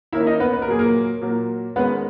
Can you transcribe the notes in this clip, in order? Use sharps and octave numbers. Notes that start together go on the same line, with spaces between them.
D#3 A#3 C#4 E4 E5
D#4 D#5
B3 B4
B4
A#4
A#2 F#3 A#3 G#4
A#3 A#4
A#2 F#3 A#3
D#3 G#3 B3 C#4 B4